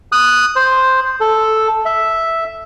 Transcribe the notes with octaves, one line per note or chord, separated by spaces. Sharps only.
D#6 F#6
C5
A4
E5